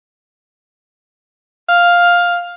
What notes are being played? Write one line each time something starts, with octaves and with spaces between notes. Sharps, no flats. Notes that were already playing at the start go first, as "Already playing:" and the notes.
F5